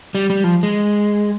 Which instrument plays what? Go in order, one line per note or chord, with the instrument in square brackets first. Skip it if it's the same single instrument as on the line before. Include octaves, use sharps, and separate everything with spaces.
[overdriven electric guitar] G3
G3
F3
G#3